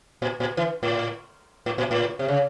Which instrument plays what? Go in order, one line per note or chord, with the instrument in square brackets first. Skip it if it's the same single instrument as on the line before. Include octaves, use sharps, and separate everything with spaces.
[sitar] A#2
A#2
E3
A2
A2
A#2
A2
C3
C#3